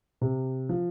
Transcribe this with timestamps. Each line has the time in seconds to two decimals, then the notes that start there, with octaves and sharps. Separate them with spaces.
0.21 C3
0.69 F3